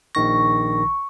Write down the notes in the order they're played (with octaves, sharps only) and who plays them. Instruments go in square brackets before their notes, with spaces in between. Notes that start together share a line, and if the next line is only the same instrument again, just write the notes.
[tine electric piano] A#1 D#3 A#6 [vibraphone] C#6